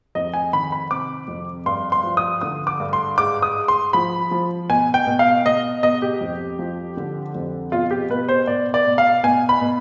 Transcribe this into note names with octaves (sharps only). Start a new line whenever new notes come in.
F2 D#5
G#5
D#3 B5
B5
C3 D6
F2
G2 C6
C6
F3
D#6
D3 D#6
D6
G2
C6
G#2 D6
D#6
G#2
C6
F3 B5
F3
B2 G#5
G5
B2
F5
B2 D#5
B2 D#5
G4
F2
F3
D3
F2
B2 F4
G4
B2 B4
C5
B2 D5
D5
B2
F5
B2 G#5
B5
B2